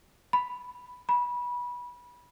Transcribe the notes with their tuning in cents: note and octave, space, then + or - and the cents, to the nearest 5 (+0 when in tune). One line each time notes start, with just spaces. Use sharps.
B5 +5
B5 -20